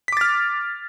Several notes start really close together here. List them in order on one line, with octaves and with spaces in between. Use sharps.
B6 D6 A6 F6